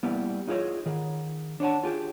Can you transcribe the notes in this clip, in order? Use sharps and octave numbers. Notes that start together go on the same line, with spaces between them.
G3 A#3 B3 E4 F5
D#4 F4 G#4 B4 C#5 D#5
D#3 G#4
D4 C#5 F#5 A5
F4 G4 G#4